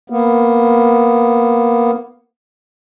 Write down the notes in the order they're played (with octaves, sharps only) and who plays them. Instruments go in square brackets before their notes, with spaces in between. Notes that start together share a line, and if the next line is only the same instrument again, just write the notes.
[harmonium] A#3 B3